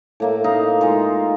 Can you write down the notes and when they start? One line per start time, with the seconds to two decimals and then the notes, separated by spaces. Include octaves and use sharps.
0.20 A2 A#3 E5
0.44 D#4 D#5 F5
0.81 G#3 D#4 F4